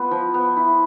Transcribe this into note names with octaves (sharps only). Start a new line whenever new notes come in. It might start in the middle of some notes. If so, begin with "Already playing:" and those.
Already playing: B3 F4
F3
B3
E4